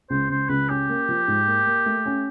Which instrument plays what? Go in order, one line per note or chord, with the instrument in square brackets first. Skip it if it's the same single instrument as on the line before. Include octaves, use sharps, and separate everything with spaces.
[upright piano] C#2 [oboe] C5
[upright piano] C#2 [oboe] C5
[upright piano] C#2 [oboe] B4
[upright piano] C#4 [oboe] G4
[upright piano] A#3
F3
G#2
A#3
A#3
A3
C#4